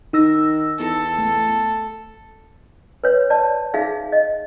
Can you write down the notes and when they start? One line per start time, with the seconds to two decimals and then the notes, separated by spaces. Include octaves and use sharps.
0.13 D#3 D#4 E6 A#6
0.79 E2 A4
1.19 A3
3.04 B4 C#5
3.30 D5 A5
3.74 D#4 G#4 E5 F5
4.12 D#5